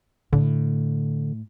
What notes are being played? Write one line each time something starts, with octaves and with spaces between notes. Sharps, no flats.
A2 D3